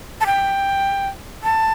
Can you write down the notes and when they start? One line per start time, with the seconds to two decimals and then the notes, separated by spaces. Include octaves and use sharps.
0.21 A5
0.26 G5
1.44 A5